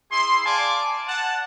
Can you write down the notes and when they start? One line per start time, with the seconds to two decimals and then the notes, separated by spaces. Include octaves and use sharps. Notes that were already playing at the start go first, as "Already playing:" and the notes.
0.12 E4 G#4 C6
0.45 D5 F5 G#5 A5 D6
1.07 F#5 A5